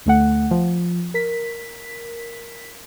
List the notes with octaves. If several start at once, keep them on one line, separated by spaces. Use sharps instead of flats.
D2 A3 F#5
F3
A#4 B6